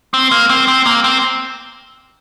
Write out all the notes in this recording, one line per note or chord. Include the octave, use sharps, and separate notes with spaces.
C4
A#3
C4
C4
A#3
C4